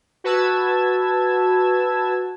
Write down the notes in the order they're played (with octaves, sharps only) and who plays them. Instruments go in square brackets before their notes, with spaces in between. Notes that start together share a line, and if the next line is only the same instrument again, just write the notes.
[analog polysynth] F#4 B4 A5 E6 G#6